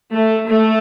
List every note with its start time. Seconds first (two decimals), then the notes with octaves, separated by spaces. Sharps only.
0.14 A3
0.48 A3